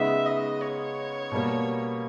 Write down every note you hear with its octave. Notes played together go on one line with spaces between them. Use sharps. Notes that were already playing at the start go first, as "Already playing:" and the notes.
Already playing: C#3 G#3 B3 D#4 E5
D#5
C#5
B2 G3 A#3